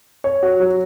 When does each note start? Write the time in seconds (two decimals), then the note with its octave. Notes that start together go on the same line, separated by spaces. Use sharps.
0.24 C#5
0.43 F#4
0.60 F#3